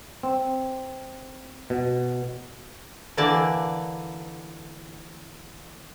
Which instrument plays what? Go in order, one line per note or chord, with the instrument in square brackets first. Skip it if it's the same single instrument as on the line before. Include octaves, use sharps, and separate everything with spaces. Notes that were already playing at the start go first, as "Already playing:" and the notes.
[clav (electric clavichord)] C4
B2
[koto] D3 E3 A#3 D5 A5